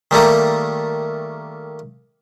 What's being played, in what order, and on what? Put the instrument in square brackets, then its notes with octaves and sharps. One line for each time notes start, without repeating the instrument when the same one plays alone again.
[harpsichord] D#3 G3 A3 A#3